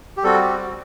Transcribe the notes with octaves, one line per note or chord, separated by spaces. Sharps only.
G4
G3 C4 F#4 A4
G4
F#4